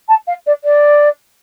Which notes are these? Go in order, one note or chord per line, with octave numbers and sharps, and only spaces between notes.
A5
F5
D5
D5